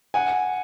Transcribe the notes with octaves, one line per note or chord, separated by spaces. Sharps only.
F#5 G#5